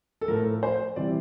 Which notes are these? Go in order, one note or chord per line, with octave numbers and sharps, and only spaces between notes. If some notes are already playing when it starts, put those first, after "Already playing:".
A4
A2 F3 A#4
C5
C3 E3 G3 D5